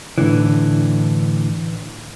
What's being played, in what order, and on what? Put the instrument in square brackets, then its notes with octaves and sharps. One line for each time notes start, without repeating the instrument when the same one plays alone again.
[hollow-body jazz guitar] A2 D3 E3